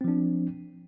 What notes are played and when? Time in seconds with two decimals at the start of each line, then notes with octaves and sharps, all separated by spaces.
0.01 C4
0.04 F3
0.08 D4